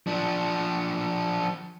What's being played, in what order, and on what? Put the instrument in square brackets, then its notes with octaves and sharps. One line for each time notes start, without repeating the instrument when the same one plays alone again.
[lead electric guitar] F3 D4